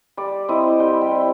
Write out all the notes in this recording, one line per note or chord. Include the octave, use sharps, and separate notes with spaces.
G3 D5
C4 E4 D#5
G3 G5
G5
C4 E4